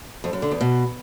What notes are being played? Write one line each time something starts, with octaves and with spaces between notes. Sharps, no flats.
F2
F#2
D3
E2
B2